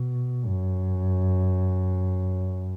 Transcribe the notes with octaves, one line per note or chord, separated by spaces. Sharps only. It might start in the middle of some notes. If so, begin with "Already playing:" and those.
Already playing: B2
F#2